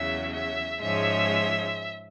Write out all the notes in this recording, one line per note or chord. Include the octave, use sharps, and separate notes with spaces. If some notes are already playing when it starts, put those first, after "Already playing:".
Already playing: E2 C#3 F#3 E5
E5
G#2 F3 G#3 C#4 E5